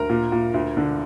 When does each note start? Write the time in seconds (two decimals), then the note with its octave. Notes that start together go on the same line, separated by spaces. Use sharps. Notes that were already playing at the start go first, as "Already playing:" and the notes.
Already playing: D2 A#4
0.09 A#2
0.32 A#2
0.54 D2
0.77 D3